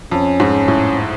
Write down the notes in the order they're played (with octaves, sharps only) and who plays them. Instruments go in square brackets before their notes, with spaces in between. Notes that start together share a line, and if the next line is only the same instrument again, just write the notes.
[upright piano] F2 [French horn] C#4
[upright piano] G#2
A2